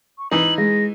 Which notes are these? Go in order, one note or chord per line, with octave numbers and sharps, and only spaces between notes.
C#6
E3 D#4 F#7
G#3 A#6